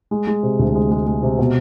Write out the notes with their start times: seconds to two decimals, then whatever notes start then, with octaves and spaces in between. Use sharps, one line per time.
0.11 G#3
0.27 G#3
0.43 C3
0.59 D2
0.75 G#3
0.91 G#3
1.07 G#3
1.23 C3
1.39 B2